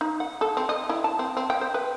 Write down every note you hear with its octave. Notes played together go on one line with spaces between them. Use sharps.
D#4
F#5
A4
C4
D#5
E4
A5
C4
C4
G5
C5
B4